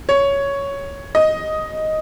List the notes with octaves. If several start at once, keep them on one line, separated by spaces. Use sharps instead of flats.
C#5
D#5